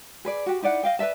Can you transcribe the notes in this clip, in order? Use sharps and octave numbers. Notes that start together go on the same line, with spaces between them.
G#4 B4 D5
F#4 G4
D#4 E4 D5 F#5
D#5 F5 G5
B4 D5 E5 A5